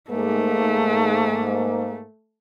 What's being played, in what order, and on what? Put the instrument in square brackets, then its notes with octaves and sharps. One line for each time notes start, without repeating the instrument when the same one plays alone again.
[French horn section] G#2 A#3 [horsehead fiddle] A3